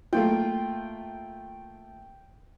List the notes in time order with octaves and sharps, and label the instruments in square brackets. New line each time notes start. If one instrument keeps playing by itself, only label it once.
[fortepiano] A3 A#3 F4 [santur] G5